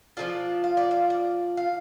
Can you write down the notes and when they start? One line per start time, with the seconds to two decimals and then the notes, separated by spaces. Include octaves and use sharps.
0.17 F3 A3 D4 F4 D5
0.64 F5
0.77 D5
0.91 F5
1.10 D5
1.57 F5